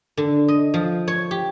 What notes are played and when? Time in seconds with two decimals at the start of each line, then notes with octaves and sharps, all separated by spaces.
0.17 D3
0.48 D#5
0.74 F3
1.08 C#5
1.31 G4